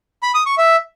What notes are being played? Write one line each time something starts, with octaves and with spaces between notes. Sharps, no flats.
B5
D#6
C#6
E5